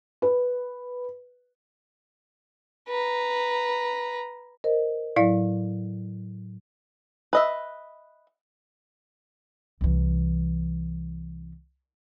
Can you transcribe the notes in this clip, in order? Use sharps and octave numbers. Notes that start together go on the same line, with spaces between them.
B4
B4 A#5
A#4 C5 D#5
A2 F#3 E4 D5 F5
B4 D#5 E5
C2 E3